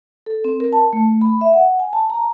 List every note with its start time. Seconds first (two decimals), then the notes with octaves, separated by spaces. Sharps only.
0.26 A4
0.44 C4
0.60 A#4
0.73 A5
0.93 A3
1.21 B5
1.41 E5
1.54 F#5
1.79 G#5
1.93 A5
2.10 A#5